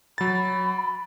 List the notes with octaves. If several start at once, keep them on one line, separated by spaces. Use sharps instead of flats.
F#3 B5 A6